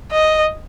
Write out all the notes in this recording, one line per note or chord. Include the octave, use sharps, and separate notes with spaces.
D#5